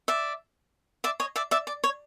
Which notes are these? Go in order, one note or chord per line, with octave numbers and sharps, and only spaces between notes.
D5 E5
D5 E5
C#5 D#5
D5 E5
D5 E5
D5
C#5